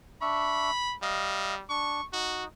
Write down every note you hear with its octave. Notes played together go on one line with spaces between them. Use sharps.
D4 E5 B5 C#6
G3 D#5 F5
D4 C#6
D#4 F#4